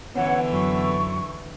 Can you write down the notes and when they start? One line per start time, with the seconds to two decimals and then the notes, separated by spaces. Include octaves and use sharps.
0.15 D3 E3 B3 C#4 C#5 F#5
0.52 F#2 F#3 C#6